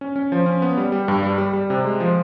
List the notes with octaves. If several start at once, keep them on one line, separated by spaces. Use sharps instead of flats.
C#4
C#4
F3
C#4
B3
G3
G3
G2
G3
G3
G3
C3
G#3
F3